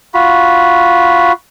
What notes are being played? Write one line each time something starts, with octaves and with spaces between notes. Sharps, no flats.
F4 F#4 B5